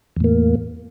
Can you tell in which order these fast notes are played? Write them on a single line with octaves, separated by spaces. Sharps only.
E2 A2 A#3